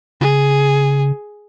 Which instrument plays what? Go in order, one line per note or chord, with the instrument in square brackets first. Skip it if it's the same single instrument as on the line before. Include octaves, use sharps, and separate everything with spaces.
[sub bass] C#3 [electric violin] G#4